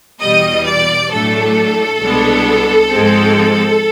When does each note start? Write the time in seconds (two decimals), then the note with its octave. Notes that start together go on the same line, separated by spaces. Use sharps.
0.23 E2 B2 G3 D#5
0.68 D5
1.12 A2 F#3 A3 D4 A4
2.01 C2 B2 G#3 B3 D4
2.91 G#2 F3 G#3 C4